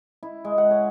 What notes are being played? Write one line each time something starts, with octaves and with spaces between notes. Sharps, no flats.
E4
G#3
F#5
C#5